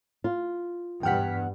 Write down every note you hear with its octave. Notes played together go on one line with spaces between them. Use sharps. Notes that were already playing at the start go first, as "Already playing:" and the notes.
F4
E2 G2 F#5 G5 F6 B6